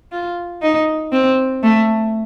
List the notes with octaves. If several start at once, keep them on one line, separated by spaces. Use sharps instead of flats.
F4
D#4
C4
A3